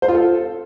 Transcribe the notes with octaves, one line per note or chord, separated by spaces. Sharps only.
C5
F4
A4